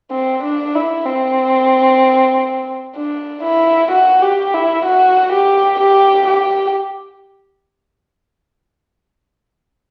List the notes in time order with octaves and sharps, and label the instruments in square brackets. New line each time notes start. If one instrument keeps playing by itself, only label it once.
[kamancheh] C4
D4
E4
C4
D4
E4
F#4
G4
E4
F#4
G4
G4
G4